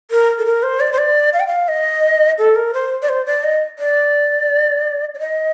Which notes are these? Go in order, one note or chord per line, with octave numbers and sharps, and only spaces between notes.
A#4
A4
A#4
C5
D5
C5
D5
F5
G5
F5
D#5
A4
A#4
C5
D5
C5
D5
D#5
D5
D5
D#5